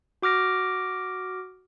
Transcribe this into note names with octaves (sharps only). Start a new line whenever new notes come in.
F#4 D6 F6 A#6 D7